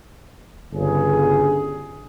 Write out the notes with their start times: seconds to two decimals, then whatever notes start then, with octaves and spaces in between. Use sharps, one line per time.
0.74 G1 C#3 G#4